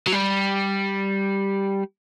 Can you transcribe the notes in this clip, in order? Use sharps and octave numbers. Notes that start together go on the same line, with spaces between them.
F#3
G3